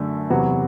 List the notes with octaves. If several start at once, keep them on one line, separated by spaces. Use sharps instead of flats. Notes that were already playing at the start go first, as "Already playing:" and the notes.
Already playing: F#2 D3 A3
E2 C3 F#3 B3 F#4